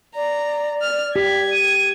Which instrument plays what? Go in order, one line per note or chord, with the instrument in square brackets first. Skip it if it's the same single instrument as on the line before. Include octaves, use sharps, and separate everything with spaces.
[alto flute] D5 [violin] A#5
[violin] F6
[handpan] G4 [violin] G#6 [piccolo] B6
[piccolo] D#7